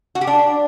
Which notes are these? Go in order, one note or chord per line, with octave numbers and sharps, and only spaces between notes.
F#4
G4
D4